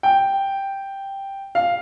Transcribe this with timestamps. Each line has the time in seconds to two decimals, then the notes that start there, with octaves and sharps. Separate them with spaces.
0.03 G5
1.55 F5